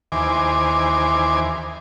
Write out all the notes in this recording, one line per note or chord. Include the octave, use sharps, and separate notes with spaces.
D#2 E3 C5 G#5 D6